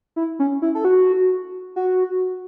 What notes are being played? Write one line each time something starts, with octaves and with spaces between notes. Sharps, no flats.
E4
C#4
E4
A4
F#4
F#4